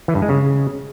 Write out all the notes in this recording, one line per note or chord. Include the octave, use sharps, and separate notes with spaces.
E3
G2
G#3
C#3